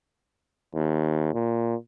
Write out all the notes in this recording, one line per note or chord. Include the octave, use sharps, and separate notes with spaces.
D#2
A#2